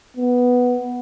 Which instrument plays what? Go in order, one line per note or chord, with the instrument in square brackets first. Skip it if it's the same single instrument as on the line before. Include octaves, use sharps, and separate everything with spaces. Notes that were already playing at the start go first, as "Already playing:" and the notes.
[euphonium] B3